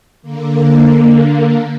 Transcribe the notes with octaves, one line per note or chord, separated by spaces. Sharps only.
D3 A#3